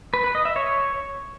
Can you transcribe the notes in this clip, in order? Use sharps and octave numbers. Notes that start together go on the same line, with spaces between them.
B4
B4
D#5
E5
C#5